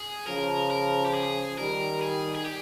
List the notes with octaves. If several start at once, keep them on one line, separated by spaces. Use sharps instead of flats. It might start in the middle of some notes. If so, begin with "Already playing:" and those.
Already playing: G#4
C#3 F3 A#4
A#4
G4
G#4
D#3 G3 A#4
G#4
G#4
G4